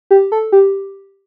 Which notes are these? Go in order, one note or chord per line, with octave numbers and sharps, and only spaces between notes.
G4
A4
G4